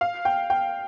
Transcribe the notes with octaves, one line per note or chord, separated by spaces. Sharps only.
F5
G5
G5